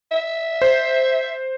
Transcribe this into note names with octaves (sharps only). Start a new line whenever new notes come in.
E5
C5